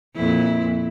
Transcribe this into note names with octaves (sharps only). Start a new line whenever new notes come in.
F2 A#2 E4